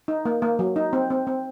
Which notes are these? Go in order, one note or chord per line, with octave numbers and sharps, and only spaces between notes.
D#4
A#3
A#3
F#3
D#4
C4
C4
C4